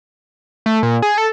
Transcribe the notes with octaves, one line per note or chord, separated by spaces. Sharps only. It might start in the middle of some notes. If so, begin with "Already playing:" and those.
A3
A#2
G#4
A4